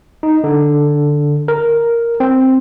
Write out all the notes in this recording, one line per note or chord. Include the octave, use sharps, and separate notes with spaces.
D#4
D3
A#4
C4